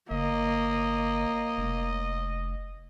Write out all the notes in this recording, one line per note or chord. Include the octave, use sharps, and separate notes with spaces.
G1 A#3 D#5
F1